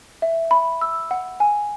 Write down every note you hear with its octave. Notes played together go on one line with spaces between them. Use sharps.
E5
B5
E6
F#5
G#5